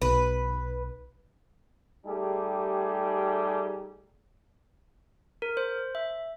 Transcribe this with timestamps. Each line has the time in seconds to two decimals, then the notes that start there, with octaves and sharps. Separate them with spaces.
0.02 B1 B4
2.06 G3 A3 D#4 G4 G#4
5.42 A#4
5.57 C5
5.95 E5